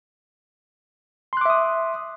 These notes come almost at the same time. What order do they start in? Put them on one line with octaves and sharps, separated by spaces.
C6 F#6 D6 E5 D#6